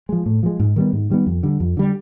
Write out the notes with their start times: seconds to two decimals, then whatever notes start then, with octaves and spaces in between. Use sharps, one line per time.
0.09 F3 G#3
0.26 A2
0.43 F3 G#3
0.59 G#2
0.76 D#3 G3 B3
0.93 G#2
1.10 D#3 G3 B3
1.27 F2
1.43 D3 G3
1.60 F2
1.77 D3 G3